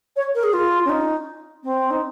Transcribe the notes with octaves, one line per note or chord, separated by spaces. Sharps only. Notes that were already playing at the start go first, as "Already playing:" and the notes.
C#5
A#4
G#4
F4
C#4
D#4
C4
D#4